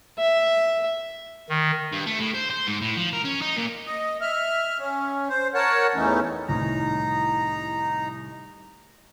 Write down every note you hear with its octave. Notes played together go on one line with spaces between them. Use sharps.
E5
D#3
G2
A3
A2
C5
C5
G#2
A2
F3
A#4
C#4
D#4
A#2
D#5
E5 F6
C#4
C5
A#4 C#5 F#5 A5
E2 A2 E3 A3 C#4 D#4
C2 A2 D#3 D#4 A#5